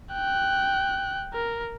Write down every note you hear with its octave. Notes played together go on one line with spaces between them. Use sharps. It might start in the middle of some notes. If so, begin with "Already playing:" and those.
G5 F#6
A#4